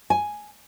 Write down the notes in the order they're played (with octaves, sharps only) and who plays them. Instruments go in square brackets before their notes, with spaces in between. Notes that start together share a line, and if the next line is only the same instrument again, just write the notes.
[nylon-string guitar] G#5